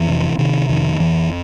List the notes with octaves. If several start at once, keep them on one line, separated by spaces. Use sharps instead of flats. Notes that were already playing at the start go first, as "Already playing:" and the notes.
Already playing: F2 E3
C3
C3 D#3
F2 D#3
F2 E3